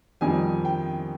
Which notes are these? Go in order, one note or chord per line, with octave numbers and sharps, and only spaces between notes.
F2 D#3 G3 C4 G#5
G5